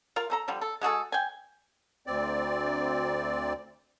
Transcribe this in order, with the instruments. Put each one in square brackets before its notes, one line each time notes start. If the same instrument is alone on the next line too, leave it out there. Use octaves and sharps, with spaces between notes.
[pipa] F4 A#4 F5
A3 A4 A#5
D3 F3 G3
A4
G#3 F#4 G#4 A4
G5 G#5
[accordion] D2 C4 D5